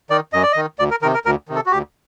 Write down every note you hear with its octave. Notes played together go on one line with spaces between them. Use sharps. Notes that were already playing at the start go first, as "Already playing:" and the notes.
D#3 D5
F#2 D#5
D5
D#5
D#3
D2 D5
A#4
C3 D#3 A#4
A#4
D2 A#4
C3 D#3
A4
F#4
D2 G4